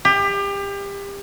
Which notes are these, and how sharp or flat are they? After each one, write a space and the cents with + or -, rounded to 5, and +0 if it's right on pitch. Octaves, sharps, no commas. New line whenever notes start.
G4 +30